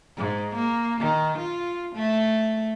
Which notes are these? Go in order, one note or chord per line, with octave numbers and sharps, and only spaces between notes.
G#2
A#3
D#3
F4
A3